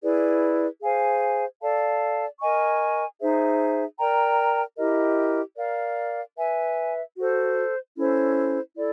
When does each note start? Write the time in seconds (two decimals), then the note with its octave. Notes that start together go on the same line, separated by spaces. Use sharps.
0.03 E4 G#4 B4 D5
0.82 G#4 C5 F5 G#5
1.61 A4 D5 F5 A5
2.40 A#4 D#5 G#5 C#6
3.20 D#4 G#4 C5 E5
3.99 A#4 D5 G5 A#5
4.78 E4 G4 A#4 D#5
5.57 A#4 D5 F5
6.37 B4 E5 G#5
7.16 F#4 A4 C5
7.96 C#4 E4 A4 C5
8.75 E4 A4 D5